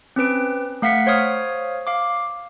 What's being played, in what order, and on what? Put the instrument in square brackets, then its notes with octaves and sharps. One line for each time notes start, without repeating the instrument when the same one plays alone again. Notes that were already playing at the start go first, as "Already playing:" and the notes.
[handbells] C4 C#4 B4 D7
A3 F5 F#5 B6 C#7
C5 C#5 F5 D#6 F6
F5 D6